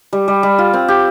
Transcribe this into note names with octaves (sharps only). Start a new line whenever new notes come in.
G3
G3
G3
F4
C4
G4